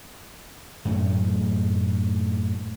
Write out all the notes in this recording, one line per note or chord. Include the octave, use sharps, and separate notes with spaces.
F#2 A2 A3